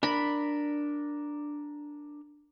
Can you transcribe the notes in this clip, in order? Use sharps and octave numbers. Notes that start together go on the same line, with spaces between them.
D4 A#4 B5